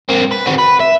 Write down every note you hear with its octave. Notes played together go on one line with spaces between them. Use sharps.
A#3 C4
B4
C4 F#4
B4
E5